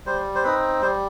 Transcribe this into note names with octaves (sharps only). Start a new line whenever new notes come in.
G3 C5
C5
C4 D#4 B4
G3 C5